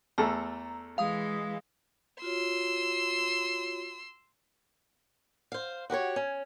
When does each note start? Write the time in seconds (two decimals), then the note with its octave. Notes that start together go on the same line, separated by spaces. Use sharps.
0.18 E2 A3 A4 A#5
0.98 E3 G#3 F5 D#6
2.22 F4 F#4 C#5 C6 E6
5.52 C5 F5
5.90 F#4 G4 B4 C#5
6.16 C#4